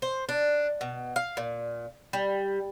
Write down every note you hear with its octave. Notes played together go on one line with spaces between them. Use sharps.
C5
D4
B2
F5
A#2
G3